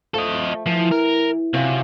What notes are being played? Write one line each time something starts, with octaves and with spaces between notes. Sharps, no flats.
F3 A3 A4 D#5
E3 F3
A#4
C3 F#3 C#4 F4